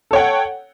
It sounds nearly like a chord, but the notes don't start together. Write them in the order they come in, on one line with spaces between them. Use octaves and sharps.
A4 C#5 G5 F#5